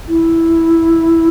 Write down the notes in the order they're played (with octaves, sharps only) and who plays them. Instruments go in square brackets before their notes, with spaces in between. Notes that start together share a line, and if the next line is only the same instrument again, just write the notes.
[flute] E4